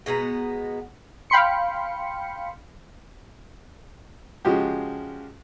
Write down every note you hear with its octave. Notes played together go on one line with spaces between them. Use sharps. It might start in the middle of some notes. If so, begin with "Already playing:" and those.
B2 G#3 B3 A#5
F5 G5 B5 C6 C#7
C#3 F3 G#3 F#4 G4